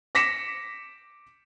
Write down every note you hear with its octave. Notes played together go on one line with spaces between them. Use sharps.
D6 A#6 B6 C#7 E7